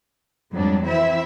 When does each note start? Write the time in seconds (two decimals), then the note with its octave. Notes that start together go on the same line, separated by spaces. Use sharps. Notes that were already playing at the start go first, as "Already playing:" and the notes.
0.52 F2 G#2 F#3 G3 D4
0.85 E3 C4 E4 E5